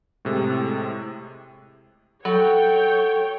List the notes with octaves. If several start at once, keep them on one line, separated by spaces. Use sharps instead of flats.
A2 C3 G#3
F#3 A4 C#5 G5